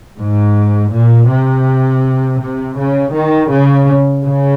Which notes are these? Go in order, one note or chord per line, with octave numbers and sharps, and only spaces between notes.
G#2
A#2
C3
C3
C#3
D#3
C#3
C#3